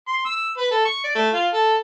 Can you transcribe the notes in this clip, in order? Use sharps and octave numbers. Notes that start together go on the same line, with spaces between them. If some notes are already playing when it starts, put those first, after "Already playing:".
C6
E6
B4
A4
C#6
D5
A3
F4
A4